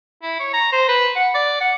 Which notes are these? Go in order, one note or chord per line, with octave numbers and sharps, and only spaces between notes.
E4
C#5
A#5
C5
B4
F#5
D5
F#5